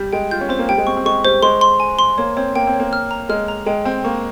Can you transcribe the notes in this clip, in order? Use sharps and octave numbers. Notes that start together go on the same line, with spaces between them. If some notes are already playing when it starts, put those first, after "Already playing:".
Already playing: G3 G6
G#3 G5
F4 G6
C#4
C4 C5
A#3
G3 G5
G#3
C4 C#6
C4
G#3 C#6
G3 C5
G#3 C6
C6
G#5
C6
A#3 C#5
C4 C#5
A#3 G5
C4
C#5
A#3
F6
A#5
G#3 F6
A#5
G#3 G5
C4 G5
A#3 C#6